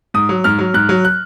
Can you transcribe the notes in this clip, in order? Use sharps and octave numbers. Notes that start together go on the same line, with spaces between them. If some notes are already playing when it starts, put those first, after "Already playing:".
G#2 D#6
F#3
G#2 F6
F#3
G#2 F#6
F#3
F#6